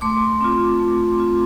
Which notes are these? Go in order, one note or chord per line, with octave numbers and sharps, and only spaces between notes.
A3 C6 D6
C4 F4
A3
C4 F4